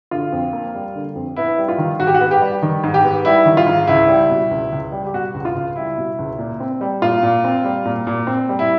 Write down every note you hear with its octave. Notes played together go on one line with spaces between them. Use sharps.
D3 F4
F2
A#3
G3
D3
F2
B3 E4
G3
F4
D#3
G#2 F#4
G4
F#4
B3
G4
G3
D#3
G#2
G4
B3
G3 E4
D#3
F4
G#2
C#2 E4
G3
B2
C#2
C#2
G3
G4
B2 F#4
C#2
F4
C#2
G3 E4
B2
C#2
A#2
C4
G3
A#2 F4
A#2
C4
G3
A#2
A#2
C4
G3
E4